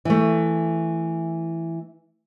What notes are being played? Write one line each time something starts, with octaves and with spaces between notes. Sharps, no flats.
E3 A3